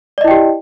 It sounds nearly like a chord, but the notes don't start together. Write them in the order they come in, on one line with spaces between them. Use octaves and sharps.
D5 D#5 E4 G5 G4